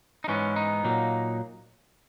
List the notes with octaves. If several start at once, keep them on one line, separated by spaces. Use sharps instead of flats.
D#4
G#2 E3 G#3 B3 C#4
D#4
A#2 F#3 A#3